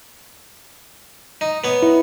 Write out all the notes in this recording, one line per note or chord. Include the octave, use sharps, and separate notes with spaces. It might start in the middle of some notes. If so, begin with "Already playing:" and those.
D#4
B3 C#5
E4